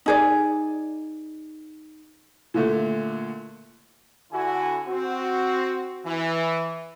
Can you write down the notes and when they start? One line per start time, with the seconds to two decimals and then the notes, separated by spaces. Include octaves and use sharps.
0.06 D#4 G#4 D5
2.54 A#2 D3 A3
4.32 D3 E4 F#4 G#5
4.87 C4 F#4
6.05 E3